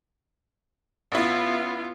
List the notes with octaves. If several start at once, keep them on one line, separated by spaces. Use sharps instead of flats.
A1 B3 E4 F4